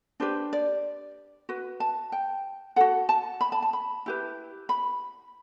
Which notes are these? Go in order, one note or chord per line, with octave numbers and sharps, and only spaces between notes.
D4 G4 B4 C5
D5
F#4 B4
A5
G5
F#4 A4 F#5
A5
B5
A5
A5
B5
E4 G4 B4
B5